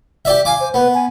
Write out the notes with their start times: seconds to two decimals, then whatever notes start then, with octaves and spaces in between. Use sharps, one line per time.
0.25 G4 D5 E5
0.45 F5 G#5 D6
0.60 C5
0.74 B3 B4
0.94 G#5